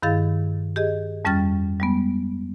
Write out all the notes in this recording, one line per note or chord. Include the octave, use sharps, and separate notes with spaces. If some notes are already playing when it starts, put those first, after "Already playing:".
G2 D#3 E4 G#4 F5 A6
G4 G#4 D#5
F2 G3 C#4 G5 F6 A6
G3 G#3 B3